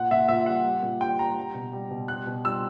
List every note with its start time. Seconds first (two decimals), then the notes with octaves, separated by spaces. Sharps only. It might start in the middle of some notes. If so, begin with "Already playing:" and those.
Already playing: A#2 F#5
0.11 A#2 E5
0.29 A#2 E5
0.46 G3 F#5
0.64 G3
0.83 A#2
1.01 G3 G5
1.19 G3 A#5
1.37 G3
1.54 B2
1.73 G3
1.91 B2
2.08 G3 F#6
2.26 B2
2.44 G3 E6